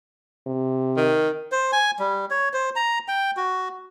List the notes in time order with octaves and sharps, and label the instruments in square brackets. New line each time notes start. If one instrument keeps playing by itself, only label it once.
[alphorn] C3
[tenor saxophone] D#3
[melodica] C5
G#5
G3
C#5
C5
A#5
G5
F#4